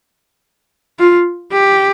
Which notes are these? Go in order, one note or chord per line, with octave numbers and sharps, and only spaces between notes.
F4
G4